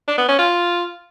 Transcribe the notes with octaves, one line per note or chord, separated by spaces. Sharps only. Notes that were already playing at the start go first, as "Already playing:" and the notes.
D4
B3
C#4
F4